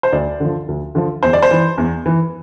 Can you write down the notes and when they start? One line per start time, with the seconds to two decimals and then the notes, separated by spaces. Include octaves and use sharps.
0.03 C5
0.13 D2 D5
0.40 D3 F3
0.68 D2
0.95 D3 F3
1.23 E2 C5
1.33 D5
1.42 C5
1.51 E3
1.78 E2
2.06 E3